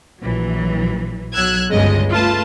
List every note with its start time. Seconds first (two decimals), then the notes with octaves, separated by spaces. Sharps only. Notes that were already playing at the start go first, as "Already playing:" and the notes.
0.20 A#1 E3 F#3
1.34 B1 F#3 E6 F#6 G#6
1.71 G1 C#2 G2 C#3 G#3 D#5
2.09 A3 F4 B4 A5